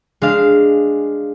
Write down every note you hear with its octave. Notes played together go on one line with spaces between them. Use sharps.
G#3 D4 F5